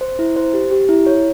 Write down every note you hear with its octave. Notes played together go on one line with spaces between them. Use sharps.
C5
E4
C5
G4
G4
E4
C#5